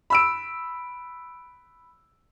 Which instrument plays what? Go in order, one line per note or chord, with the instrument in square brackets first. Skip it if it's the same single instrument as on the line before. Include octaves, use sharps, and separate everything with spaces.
[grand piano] B5 E6 D7